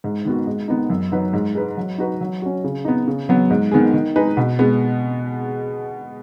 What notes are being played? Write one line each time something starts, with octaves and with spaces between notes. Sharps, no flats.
G#2
D#3 B3 F#4
G#2
D#3 B3 D#4
F#2
F#3 D#4 B4
G#2
G#3 D#4 B4
F#3
D#4 F#4 B4
F#3
C#4 F#4
C#3
B3 D#4
C#3
F#3 B3
G#2
D#3 B3 G#4
D#3
G#3 D#4 G#4 B4
B2
G#3 B3